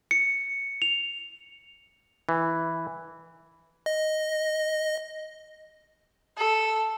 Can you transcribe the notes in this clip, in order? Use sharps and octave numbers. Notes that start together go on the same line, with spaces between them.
C#7
F7
E3
D#5
A4